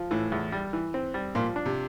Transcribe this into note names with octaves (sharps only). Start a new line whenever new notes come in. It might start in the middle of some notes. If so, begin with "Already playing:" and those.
Already playing: F3
A2 E3
E2
G3
E3
C4
G3
A#2 F3
D4
C3